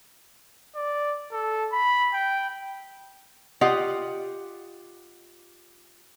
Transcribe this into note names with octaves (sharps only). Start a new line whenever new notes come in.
D5
A4
B5
G5
F4 G4 D#5 F#5